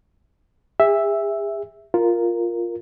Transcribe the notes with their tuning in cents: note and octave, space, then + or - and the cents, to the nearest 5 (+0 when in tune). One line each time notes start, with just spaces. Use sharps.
G#4 -40 E5 +0
F4 +0 A#4 +0